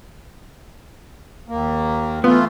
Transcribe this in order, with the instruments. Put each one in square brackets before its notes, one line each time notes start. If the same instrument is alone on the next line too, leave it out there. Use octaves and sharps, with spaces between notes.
[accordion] D#2 A#3
[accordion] E3 A3 F4 [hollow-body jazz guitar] B3